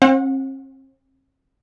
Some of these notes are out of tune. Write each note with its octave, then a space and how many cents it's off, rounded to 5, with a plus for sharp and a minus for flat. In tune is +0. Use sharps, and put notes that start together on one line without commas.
C4 +45 F#5 -25